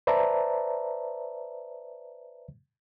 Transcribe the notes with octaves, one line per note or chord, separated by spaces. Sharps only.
B4 C5 D5 E5 A5 A#5